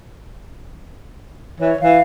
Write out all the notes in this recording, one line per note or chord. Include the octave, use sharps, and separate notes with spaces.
E3 C#5
E3 F5